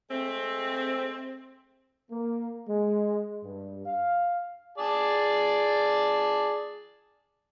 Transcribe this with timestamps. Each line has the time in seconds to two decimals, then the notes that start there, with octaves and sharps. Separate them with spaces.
0.10 G#3 A3 C4
2.11 A#3
2.68 G#3
3.44 G2
3.86 F5
4.78 G#4 D5 A5